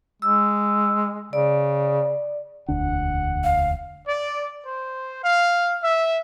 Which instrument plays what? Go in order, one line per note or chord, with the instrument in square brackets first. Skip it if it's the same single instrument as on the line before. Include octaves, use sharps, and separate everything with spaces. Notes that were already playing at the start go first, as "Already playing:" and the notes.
[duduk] G#3 [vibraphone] E6
[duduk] C#3 [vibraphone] D5
[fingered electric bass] E1 D2 D4 [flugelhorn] F#5
[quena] F5
[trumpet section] D5
C5
F5
E5